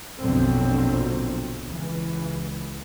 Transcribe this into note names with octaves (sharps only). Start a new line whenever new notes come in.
A#1 F2 B2 D3 F#3 C4
C#2 E3